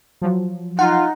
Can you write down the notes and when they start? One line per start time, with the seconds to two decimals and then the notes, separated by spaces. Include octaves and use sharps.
0.22 F3 F#3
0.79 D#4 F4 F#5